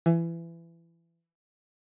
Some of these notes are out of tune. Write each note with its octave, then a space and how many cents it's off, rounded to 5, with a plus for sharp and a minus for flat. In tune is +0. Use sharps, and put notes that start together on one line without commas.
E3 +25